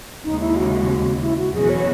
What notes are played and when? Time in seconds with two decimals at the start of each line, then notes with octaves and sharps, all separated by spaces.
0.24 D#2 C#3 G#3 D#4
0.40 E4
0.56 F#4
1.22 E4
1.38 F#4
1.53 E2 B2 F#3 C#4 F#4 G#4
1.69 C#5